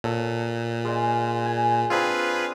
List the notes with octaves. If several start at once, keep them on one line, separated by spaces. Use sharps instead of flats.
A#2 A4 C#5
G#3 D5 F5
G#5
C4 D4 F4 G#4 B4 A5